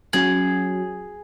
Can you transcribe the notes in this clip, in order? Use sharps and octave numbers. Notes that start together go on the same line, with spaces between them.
F#3 C#4 F#4 G#4